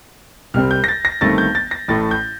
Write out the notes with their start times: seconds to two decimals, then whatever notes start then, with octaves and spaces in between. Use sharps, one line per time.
0.54 C2 C3 G3 C4 F6
0.71 G6
0.84 A#6
0.88 A6
1.05 A#6
1.21 G1 G2 D#3 A3 C4 A6
1.38 G6
1.55 A6
1.71 A#6
1.88 A1 A2 A3 A6
2.11 G6